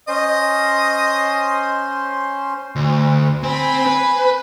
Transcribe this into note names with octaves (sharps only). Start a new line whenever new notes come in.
C#4 C5 D#5 C6
D2
C4 C5 G#5 B5
B4